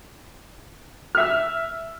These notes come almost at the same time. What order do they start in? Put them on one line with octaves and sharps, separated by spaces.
F6 E5 E6